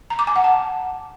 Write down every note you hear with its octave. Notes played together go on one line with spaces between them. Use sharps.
A#5
D6
G#5
F#5
A5